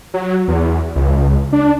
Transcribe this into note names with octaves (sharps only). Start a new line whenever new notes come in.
F#3
E2
C#2
D4